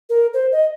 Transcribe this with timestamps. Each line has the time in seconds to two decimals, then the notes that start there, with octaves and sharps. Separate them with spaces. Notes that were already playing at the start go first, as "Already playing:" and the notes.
0.10 A#4
0.34 C5
0.52 D#5